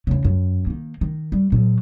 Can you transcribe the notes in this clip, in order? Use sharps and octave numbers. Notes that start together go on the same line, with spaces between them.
E2 C#3
F#2
D#3 A#3
D#3
G3
A#2 F#3